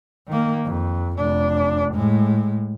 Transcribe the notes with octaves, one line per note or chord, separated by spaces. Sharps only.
D#3 A#3
F2
F1 D4
A2 G#3